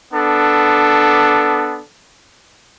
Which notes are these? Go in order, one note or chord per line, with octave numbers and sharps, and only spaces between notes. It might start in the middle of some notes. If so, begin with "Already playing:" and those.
B3 D4 A4